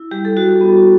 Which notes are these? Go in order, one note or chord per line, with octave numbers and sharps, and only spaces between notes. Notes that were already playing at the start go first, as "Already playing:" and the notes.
Already playing: E4
G3 G4
A4
G3 F#4
B3